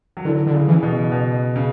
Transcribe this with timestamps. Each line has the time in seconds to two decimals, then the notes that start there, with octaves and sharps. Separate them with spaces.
0.17 F#3
0.25 D3 E3
0.46 D3
0.54 C#3
0.68 E3
0.72 C#3
0.83 B2
1.12 B2
1.56 C#3